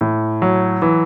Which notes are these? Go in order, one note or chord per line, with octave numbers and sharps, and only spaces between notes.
A2
F#3
E3